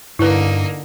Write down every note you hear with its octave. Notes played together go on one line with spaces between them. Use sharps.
G2 D3 A#3 D#4 E4 B4